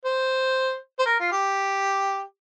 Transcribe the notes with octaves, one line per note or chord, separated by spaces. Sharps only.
C5
C5
A#4
F4
G4